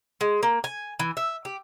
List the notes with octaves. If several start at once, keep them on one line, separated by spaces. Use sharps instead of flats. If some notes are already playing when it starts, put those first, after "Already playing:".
G#3
A#3
G#5
E3
E5
G4